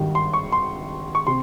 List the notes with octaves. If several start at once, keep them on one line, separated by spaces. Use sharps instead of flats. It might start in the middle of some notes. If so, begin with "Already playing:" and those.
Already playing: G#1 G2 D#3 G3
C6
C#6
C6
C#6
C3 C6